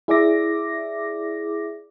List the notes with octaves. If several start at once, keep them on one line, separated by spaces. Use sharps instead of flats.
E4 G#4 D5 E5 D6 A#6